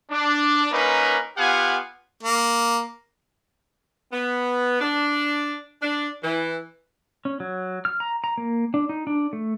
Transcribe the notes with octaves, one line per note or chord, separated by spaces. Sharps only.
D4
A#3 C#4 D#4 A#4 B4
B3 F4 G4 F5 F#5 G#5
A#3
B3
D4
D4
E3
C#4
F#3
F6
A#5
A#5
A#3
D4
D#4
D4
A3